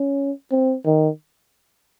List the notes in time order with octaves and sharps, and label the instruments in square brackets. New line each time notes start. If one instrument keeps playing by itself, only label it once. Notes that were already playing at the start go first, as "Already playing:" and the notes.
Already playing: [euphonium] C#4
C4
D#3